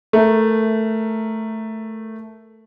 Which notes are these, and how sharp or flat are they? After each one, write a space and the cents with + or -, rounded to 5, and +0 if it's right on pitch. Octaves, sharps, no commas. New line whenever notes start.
A3 +0 A#4 -5